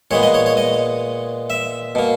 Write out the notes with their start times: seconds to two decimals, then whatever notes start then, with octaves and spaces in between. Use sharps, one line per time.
0.11 A#2 G#3 B3 C#5
0.23 D#5
0.34 C#5
0.46 C#5
0.57 D#5
1.50 E5
1.95 B2 A#3